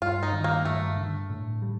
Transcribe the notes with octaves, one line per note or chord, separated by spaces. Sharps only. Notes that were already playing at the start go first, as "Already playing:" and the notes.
G2 F4
D#4
D#3
A#3
G2 A3
D3
A2
G3